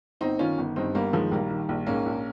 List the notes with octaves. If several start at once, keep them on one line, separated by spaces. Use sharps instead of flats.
G1 C4 D#4
D#3 C#4 F4
G1
G2 C4 D#4
G1 G3 A#3
D#3 F3 G#3
A#1 G3 A#3
D#3
A#1
G#2 A#3 C#4
A#1